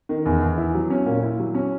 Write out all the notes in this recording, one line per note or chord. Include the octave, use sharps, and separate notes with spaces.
D#3
E2
E2
E4
F#3
C#4
A#2
E4
F#3
C#4